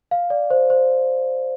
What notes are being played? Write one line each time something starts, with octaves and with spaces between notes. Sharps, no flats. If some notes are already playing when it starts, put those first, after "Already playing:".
F5
D5
C5
C5